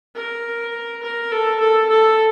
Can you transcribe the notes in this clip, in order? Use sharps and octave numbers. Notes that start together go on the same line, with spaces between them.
A#4
A#4
A4
A4
A4